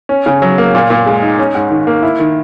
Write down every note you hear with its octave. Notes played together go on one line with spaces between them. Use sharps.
C#4
C#3
F#3
A#3
A#2
A#2
G#3
D#4
C#4
G#2
D#3
A#3
E4
D#3